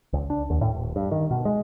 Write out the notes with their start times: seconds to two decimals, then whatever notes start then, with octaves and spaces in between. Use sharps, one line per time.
0.13 C#2
0.30 D4
0.50 D#2
0.61 A2
0.75 D#1
0.96 G2
1.11 D#3
1.31 B2
1.45 G#3